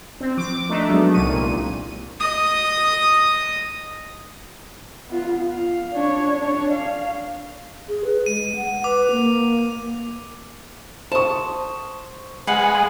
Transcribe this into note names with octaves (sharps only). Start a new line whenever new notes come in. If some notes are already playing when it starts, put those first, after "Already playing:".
C4
F3 D6
A3 D4 D#4
F#3 G#3 B3
C2 A#2 C#6 D#7
D#5 D#6
B3 F4
F5
D4 C#5
D4 C#5
F5
G#4
B4
G#3 D#7
F#5
B4 D6
A#3
C5 A5 C#6 D#6
G#3 B4 F5 F#5